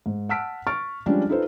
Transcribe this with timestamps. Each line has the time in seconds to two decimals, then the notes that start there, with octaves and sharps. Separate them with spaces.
0.06 G#2
0.29 F#5 A5 E6 F6 B6 D7
0.67 C#6 F6 A6 D7
1.06 F3 G3 G#3 C#4 D4
1.29 D#4 F4 A4 B4 C5